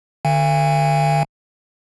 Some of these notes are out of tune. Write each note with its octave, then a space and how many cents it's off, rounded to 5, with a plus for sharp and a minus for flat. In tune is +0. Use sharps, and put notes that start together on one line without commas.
D3 +35 F5 -45 G#5 -35